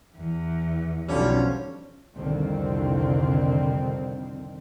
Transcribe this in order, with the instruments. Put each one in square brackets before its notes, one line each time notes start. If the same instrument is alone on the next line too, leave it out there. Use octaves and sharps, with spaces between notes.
[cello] E2
[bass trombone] B1 [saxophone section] D3 F3 G3 [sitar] C#4
[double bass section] C2 F2 D3 D#3 C4